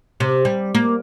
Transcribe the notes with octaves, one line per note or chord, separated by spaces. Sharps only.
C3
G3
A#3